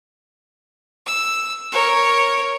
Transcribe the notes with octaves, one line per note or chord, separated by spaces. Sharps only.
E6
A#4 C#5